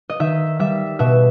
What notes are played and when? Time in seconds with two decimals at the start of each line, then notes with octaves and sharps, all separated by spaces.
0.10 D#5
0.20 D#3 E5
0.59 G3 E5
0.99 B2 E5